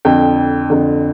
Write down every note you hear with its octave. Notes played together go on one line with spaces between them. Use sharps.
F2 D3 G5
F2 D3